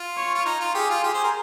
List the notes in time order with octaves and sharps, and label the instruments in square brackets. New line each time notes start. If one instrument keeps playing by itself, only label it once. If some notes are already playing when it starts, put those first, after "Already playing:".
Already playing: [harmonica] F4
[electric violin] C#5
[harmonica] F4
D#4
F4
[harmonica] G4 [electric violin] G#4
[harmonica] F4
[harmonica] G4 [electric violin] G#4
[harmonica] C5
A#4